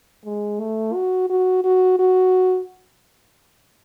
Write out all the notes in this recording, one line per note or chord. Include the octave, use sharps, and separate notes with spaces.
G#3
A3
F#4
F#4
F#4
F#4